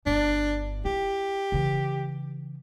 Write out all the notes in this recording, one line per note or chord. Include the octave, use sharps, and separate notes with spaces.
G1 D4
E4 G4
C#3 E3